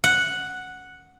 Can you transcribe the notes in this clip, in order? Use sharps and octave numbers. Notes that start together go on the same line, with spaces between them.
F#5